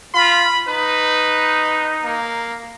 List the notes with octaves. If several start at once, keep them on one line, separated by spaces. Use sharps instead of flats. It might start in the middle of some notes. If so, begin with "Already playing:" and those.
F4 B5
D#4 B4
A#3